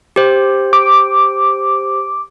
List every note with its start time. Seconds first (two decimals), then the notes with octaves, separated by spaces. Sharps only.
0.16 G4 C5
0.73 D6